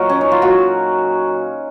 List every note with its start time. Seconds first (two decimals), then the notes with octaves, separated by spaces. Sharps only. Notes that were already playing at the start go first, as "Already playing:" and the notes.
Already playing: A#2 F#3 F#4 A#4 D#5 G#5
0.09 C#4
0.21 D#4
0.32 F4
0.42 A#2 F#3 F#4